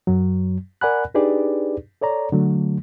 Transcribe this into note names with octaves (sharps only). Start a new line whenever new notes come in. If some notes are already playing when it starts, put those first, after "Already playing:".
F#2 F#3
A#4 D5 F#5 G#5 B5 F#6
D4 D#4 G4 G#4 B4 D5
A4 C#5 D5 A#5
D3 F#3 A3